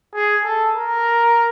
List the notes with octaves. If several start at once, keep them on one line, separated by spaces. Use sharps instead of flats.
G#4
A4
A#4